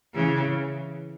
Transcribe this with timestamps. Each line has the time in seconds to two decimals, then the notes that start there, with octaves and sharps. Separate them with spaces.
0.14 C#3 E3